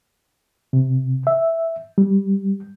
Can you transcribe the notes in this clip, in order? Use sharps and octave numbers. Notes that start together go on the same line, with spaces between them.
C3
E5
G3